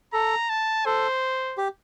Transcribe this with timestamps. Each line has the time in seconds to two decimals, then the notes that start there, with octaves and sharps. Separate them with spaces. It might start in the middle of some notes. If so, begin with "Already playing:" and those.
0.13 A4 A#5
0.49 A5
0.86 A4 C5
1.57 G4